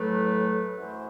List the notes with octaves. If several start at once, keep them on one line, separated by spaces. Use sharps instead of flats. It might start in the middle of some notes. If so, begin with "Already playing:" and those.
Already playing: A2 F#3 A3 B4
F#2 E3 A3 C5